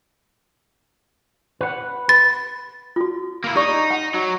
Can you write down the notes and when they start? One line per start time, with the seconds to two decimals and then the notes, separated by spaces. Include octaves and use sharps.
1.61 B4 F#5
2.09 B4 A6
2.96 F4 F#4
3.44 A#3 E4
3.56 D#4 G4 D5 C#6
3.91 F#5
4.14 F#3